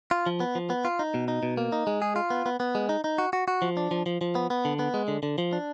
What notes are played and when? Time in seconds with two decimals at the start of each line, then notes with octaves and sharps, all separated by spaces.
0.11 F4
0.26 F3
0.40 B3
0.55 F3
0.70 B3
0.85 F4
0.99 D#4
1.14 B2
1.28 D#4
1.43 B2
1.57 A#3
1.72 D#4
1.87 G#3
2.02 G#4
2.16 F4
2.30 B3
2.46 B3
2.60 B3
2.75 G#3
2.89 D#4
3.04 D#4
3.18 F#4
3.33 F#4
3.48 F#4
3.62 F3
3.77 D4
3.91 F3
4.06 F3
4.21 F3
4.35 B3
4.50 B3
4.65 D3
4.79 B3
4.94 G#3
5.08 D3
5.23 D3
5.38 F3
5.53 D4